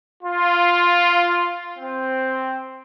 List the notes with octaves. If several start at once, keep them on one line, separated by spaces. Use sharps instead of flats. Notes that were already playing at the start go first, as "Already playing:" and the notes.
F4
C4